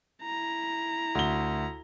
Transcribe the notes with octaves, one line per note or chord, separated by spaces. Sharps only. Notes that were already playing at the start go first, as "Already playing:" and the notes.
E4 A#5
D2 G7